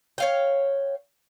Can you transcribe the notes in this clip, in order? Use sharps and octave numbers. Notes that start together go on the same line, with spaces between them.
C#5 F5 G5